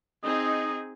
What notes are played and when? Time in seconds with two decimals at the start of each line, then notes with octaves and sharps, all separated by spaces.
0.24 C4 D#4 G#4 D#5